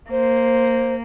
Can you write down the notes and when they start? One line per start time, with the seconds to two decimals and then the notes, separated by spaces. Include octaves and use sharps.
0.11 A#3 C5